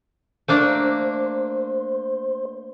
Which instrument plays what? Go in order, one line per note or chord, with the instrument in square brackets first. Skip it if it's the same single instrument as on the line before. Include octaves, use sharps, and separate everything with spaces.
[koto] A3 A#3 D4 [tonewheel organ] C5